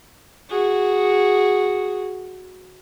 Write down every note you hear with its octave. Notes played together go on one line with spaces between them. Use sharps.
F#4 G#4